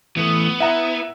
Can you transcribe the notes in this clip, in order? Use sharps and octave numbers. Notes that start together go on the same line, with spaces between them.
E3 A3 B3
E4 E5 F#5 A#5